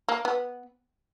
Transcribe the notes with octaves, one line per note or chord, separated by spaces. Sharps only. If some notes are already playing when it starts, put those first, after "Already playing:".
A#3
B3